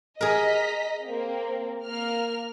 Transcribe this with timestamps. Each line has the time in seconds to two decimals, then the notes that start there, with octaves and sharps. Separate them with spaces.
0.21 G#4 A#4 D#5 A#5 B6
1.02 A#3 C4
1.85 A#3 F6